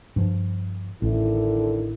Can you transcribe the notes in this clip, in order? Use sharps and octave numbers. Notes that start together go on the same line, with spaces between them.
G2 F3
A1 D3 D#3 E4